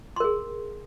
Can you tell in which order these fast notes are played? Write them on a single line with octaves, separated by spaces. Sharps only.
C6 A#4 G#4